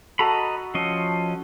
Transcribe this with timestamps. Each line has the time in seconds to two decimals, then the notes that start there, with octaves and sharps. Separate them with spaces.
0.19 F#4 A4 D#5 A#5 B5
0.75 F3 C#4 D#5